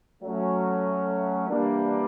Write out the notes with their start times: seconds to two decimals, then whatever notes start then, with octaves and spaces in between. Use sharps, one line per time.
0.22 F#3 A3 C#4
1.49 E3 G3 A#3 D4